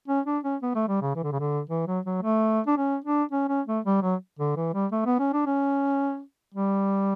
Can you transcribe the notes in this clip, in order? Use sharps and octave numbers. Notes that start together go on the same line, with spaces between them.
C#4
D4
C#4
B3
A3
G3
C#3
E3
D3
C#3
D3
E3
F#3
F#3
A3
D4
C#4
D4
C#4
C#4
A3
G3
F#3
D3
E3
G3
A3
B3
C#4
D4
C#4
G3